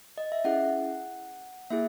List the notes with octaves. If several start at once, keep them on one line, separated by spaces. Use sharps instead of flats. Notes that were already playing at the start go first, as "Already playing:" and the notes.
D#5
E5
C#4 E4 G#4 F#5
A#3 E4 G#4 E5